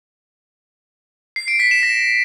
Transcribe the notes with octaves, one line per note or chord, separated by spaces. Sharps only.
C7
D7
B6
E7
A#6